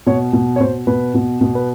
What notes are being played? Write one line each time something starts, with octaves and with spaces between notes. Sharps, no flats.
B2 C#5
B2
C#5
B2 C5
B2 B4
B2
B2
B4